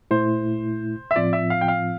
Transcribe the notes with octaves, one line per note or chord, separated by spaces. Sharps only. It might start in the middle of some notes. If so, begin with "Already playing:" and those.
A#2 A3 E4 C5
E5
A2 F3 C4 F4 D5
E5
F5
G5
F5